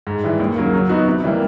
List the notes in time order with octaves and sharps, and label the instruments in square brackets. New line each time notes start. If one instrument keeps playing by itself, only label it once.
[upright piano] G#2
E3 G3
D#2
C#3 F#3 A#3
F#3
B3 D#4 F#4
C3
E3 G3 A#3